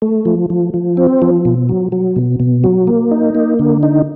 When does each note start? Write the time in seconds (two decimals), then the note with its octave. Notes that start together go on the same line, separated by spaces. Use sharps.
0.02 A3
0.25 F3
0.50 F3
0.74 F3
0.97 C4
1.22 F3
1.45 B2
1.69 F#3
1.92 F#3
2.16 B2
2.40 B2
2.64 F#3
2.87 A#3
3.11 D#4
3.35 A#3
3.59 D3
3.83 D#4